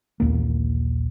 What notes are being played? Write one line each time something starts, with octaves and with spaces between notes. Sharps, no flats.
A#1 D#2 E3 A#3